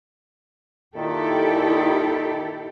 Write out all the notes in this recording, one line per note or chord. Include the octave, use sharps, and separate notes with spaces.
A#2 D#3 E4 G4 A4